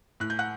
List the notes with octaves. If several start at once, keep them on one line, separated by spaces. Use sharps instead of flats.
A2 F#6
G6
F#5 F#6